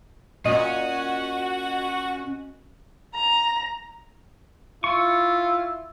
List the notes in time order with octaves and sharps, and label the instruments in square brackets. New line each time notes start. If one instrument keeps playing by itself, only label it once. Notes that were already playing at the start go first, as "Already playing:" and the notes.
[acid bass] A#2 [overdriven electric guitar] C#4 [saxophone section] F#4 [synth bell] D#5
[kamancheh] A#5
[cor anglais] E4 [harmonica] F4 [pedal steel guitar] C#6